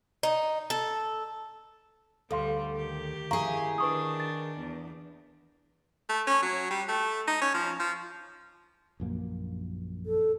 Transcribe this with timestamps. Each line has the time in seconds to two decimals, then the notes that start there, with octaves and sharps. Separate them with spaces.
0.23 D#4
0.70 A4
2.31 D2 G3 A4 F5 C6
2.74 D#3 G4
3.31 E4 G#4 F5 A#5 C#6
3.78 D#3 D4 B4 C#6 D#6
4.20 A6
4.60 E2
6.09 A3
6.27 C#4
6.42 F#3
6.71 G3
6.88 A3
7.28 D#4
7.42 C#4
7.54 F3
7.80 F3
9.00 A#1 F#2 A#3
10.06 A4